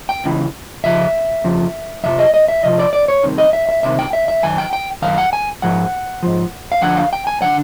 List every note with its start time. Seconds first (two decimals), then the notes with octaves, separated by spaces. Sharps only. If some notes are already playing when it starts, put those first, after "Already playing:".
0.09 G5
0.24 C#2 C#3 E3
0.84 F2 C#3 F3 E5
1.44 F2 C#3 F3
2.04 F2 C3 F3 E5
2.19 D#5
2.34 D#5
2.48 E5
2.63 F2 C3 F3 D#5
2.79 D5
2.93 D5
3.08 C#5
3.23 C2 C3 D#3
3.38 D#5
3.53 E5
3.69 E5
3.83 C2 C3 D#3 E5
3.99 G5
4.13 E5
4.28 E5
4.43 F#2 D#3 G#5
4.58 G5
4.73 G5
5.02 F#2 D#3 F5
5.18 F#5
5.33 G#5
5.62 G#2 F3 F#5
6.23 G#2 F3
6.72 F5
6.82 F2 D3 F3 F#5
6.97 F5
7.13 G5
7.27 G#5
7.42 D3 F3 F#5